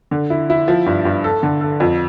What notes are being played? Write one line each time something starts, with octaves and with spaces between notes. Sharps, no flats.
D3
E4
E4
F3
G2
G2
A4
D3
A4
F2